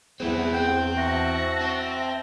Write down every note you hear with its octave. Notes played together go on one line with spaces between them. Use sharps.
E2 B3 C4 E4 G#4 F#5
C4 G5
F#4 E5 A5 A#6
C4